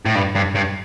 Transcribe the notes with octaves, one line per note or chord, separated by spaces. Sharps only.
A2
G2
G2
G2